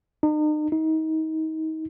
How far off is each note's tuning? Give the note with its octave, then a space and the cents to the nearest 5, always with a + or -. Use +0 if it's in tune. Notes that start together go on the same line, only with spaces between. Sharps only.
D#4 -40
D#4 +30